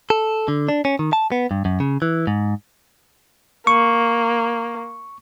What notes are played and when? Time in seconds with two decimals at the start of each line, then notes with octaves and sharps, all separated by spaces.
0.10 A4
0.48 D3
0.69 D4
0.85 C#4
0.99 D#3
1.13 A5
1.32 B3
1.51 G2
1.65 F#2
1.80 C#3
2.02 E3
2.27 G#2
3.67 A#3 C#6